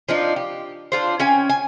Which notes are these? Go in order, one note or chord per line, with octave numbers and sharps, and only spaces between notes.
F3 D4 D#4
G4
D4 F4 C5
C#4 G5 G#5
G#5